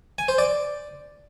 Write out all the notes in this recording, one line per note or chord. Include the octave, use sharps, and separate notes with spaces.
G#5
C5
D5